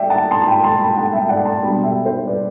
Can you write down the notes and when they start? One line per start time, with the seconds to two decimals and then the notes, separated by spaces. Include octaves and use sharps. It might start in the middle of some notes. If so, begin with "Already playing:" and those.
Already playing: D5 E5 G5
0.09 F#5 A5
0.31 A5 C6
0.42 A5
0.47 G5 B5
0.64 A5 C6
0.81 G5 B5
0.97 F#5 A5
1.13 E5 G5
1.29 D5 F#5
1.45 A5 C6
1.62 B2 G3 D4 G5 B5
1.83 E5 G5
2.05 C5 E5
2.27 B4 D5